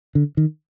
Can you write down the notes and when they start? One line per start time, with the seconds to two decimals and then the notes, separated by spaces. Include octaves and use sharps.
0.15 D3
0.37 D#3